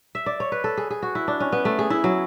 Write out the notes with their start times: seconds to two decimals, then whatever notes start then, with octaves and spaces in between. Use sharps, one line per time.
0.15 E5
0.26 D5
0.40 C#5
0.52 B4
0.64 A4
0.77 G#4
0.90 G#4
1.03 F#4
1.15 E4
1.28 D4
1.40 C#4
1.52 B3
1.65 A3
1.79 G#4
1.90 E4
2.04 F#3